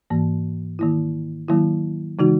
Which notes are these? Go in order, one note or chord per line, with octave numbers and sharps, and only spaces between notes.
G#2 E3 A#3
D#3 A#3 E4
D#3 F#3 A#3 E4
C#3 E3 G#3 D#4 F#4